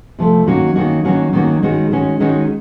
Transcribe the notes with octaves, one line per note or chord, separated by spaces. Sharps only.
C3 F3 A3
D#3 F#3 A#3 C#4 F#4
D#3 F#3 A#3 C#4 F#4
D#3 F#3 A#3 C#4 F#4
D#3 F#3 A#3 C#4 F#4
D#3 G#3 C#4 F#4
D#3 G#3 C#4 F#4
D#3 G#3 C#4 F#4